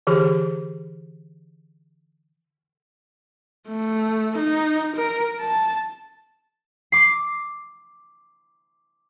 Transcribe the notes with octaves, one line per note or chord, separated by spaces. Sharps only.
D3 E3 G4 G#4
A3
D#4
A#4
A5
D6 C7